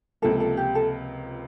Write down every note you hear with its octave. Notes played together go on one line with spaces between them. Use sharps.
C#2 C3 F3 A#3 A4
A4
G4
A4